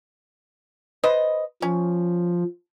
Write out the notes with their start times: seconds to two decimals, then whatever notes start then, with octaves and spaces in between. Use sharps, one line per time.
1.04 B4 C5 D#5
1.62 F3 C#4